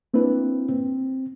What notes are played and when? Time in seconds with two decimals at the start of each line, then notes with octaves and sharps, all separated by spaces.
0.14 A#3 C4 D4 E4 B4
0.69 C4